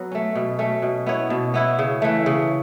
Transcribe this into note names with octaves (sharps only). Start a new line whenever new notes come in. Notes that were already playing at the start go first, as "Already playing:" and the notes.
Already playing: F#3 B3 A4
A3 C#4
B2
A3 C#4
B2
B3 E4 C#5
B2
B3 E4 C#5
C#3
E3 A3
C#3